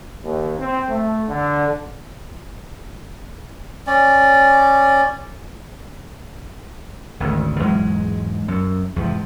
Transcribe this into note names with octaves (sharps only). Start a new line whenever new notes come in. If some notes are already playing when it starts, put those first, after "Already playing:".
D#2
C4
A3
D3
C#4 D5
G#1 D2 C#3
E2 G#2 F#3 G#3
F#2
E2 G#2 C3 F3